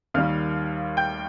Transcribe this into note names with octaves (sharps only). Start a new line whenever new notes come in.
D#2 D#3 G3 F5 F6
G5 G6